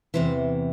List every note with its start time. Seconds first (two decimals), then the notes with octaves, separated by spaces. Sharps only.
0.14 E2 C3 E3 C5